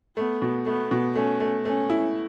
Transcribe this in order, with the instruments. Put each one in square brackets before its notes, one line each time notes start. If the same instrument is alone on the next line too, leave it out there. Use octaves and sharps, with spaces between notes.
[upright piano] A3 [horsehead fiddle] B3
[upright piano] B2
[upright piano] A3 [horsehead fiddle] B3
[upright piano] B2
[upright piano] A3 [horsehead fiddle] C#4
[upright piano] A3
[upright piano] A3 [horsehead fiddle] C#4
[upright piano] E4